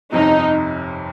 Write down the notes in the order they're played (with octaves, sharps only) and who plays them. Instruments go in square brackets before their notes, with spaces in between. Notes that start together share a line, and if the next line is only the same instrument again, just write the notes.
[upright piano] G1 F2 C3 [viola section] D#4